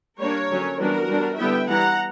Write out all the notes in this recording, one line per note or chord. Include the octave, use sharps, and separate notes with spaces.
G3 A#3 D4 A#4 C#5
D3 F#3 C#4
E3 G3 B3 D4 F#4 A#4
G3 B3 D4
D3 G3 B3 E4 E5 G5
E3 G3 B3 E4 F#5 A#5